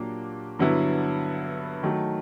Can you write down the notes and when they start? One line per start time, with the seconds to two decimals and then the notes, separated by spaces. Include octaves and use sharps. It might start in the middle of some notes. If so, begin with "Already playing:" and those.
Already playing: A#2 F#3 A#3 D4 G4
0.59 G2 D3 F#3 B3 E4
1.83 D#3 F#3 A3